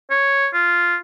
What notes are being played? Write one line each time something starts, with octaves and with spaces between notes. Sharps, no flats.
C#5
F4